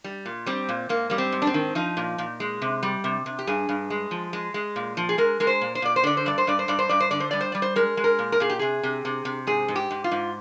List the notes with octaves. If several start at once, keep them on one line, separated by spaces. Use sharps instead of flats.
G3
A#2
G3 C4
A#2
G#2 A#3
G3 A#3
C4
G#2
D4
C4
D#3
F3 D#4
A#2
A#2
G#3
C3
G3
C3
C3
G4
G2 G#4
G2
G#3
F3
G#3
G#3
A#2
F3
G#4
G#3 A#4
G#3 A#4
C5
A#2
C5
A#2 D5
C5
D3 D5
C5
G2 D5
C5
G2 D5
C5
G2 D5
C5
G2 D5
C5
D3 D5
C5
G3 D5
C5
G3 D5
C5
G#3 A#4
G#3
A#4
A#2
A#4
A#2 G#4
G4
C3 G#4
C3
C3
C3
G#2 G#4
G#2
G4
G#2
F4
G#2